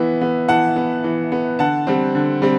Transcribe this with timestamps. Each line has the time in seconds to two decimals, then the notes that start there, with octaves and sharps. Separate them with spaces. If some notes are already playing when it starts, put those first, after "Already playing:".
Already playing: E3 B3 E5
0.21 B3
0.49 E3 F#5 A5
0.76 B3
1.04 E3
1.32 B3
1.59 D3 F#5 A5
1.87 G3 C4
2.15 D3
2.42 G3 C4